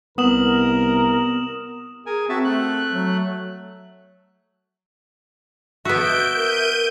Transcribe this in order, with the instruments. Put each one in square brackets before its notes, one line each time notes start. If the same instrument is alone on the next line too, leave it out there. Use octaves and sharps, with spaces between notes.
[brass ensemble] C2 A#4 [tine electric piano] B3 [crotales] D#6 E7 F#7
[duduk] G#4 [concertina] A#4 G#5
[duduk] C4 [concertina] F#4 E5 A5
[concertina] A3 F#6
[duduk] F#3
[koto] B3 F#4 [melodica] E5 [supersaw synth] G6 D7
[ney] A#4 [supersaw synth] G6 D#7